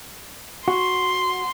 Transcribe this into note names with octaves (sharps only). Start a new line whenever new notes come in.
F#4 C6